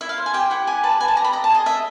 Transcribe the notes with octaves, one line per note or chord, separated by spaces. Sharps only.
E4 E5
F5
C5
G#5
G4 G5
E4 F#5
G4 G#5
B4 A5
B4 G#5
A5
G4 A#5
B5
D#5 A#5
A5
G#4
D#5
D#5 E5